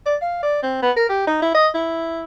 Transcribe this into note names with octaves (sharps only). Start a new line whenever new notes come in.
D5
F5
D5
C4
B3
A#4
G4
D#4
E4
D#5
E4